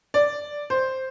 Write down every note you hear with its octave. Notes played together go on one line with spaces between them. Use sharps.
D5
C5